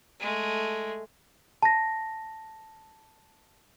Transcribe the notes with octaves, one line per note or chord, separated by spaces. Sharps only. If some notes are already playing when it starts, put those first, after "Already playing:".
G#3 A3
A5 A#6